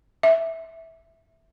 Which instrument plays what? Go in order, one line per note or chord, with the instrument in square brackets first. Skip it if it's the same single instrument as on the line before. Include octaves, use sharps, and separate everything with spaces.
[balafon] E5